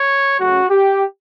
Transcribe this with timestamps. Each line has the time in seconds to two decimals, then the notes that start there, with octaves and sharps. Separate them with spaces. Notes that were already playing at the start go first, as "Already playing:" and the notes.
Already playing: C#5
0.39 C#3 F#3 A3 C#4 F#4
0.70 G4